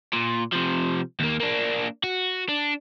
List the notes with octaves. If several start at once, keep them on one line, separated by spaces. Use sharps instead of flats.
A#2
C3 F3
D#2 A#3
A#3 D4
F#4
D4